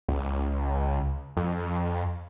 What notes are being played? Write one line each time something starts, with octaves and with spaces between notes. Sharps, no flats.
C#2
F2